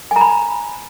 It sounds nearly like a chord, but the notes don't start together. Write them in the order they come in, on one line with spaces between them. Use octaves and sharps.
G#5 A#5 B5